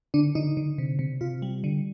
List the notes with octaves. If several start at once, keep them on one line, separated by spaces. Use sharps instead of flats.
D3 D4
D3 D#4
D3
C3
C3
C3 F4
G3
D3